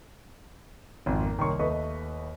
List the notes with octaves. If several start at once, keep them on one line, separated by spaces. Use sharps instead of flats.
G#1 F2 F4
A#3
C2 D#3 A#3 C#5 C6 C#6
D#2 A3 B4 D#5 C#6